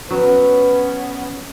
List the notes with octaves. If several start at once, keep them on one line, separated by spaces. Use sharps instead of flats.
F#3 B3 C#4 B4